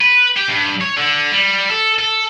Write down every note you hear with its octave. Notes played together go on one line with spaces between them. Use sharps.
B4
G4
G2
C#5
D3
G3
A4
A4